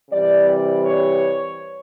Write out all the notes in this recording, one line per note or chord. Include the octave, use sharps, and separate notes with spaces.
C3 E3 G3 D5
D5
C#5